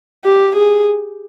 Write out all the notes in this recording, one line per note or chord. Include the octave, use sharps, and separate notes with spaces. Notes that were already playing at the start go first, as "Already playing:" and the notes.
G4
G#4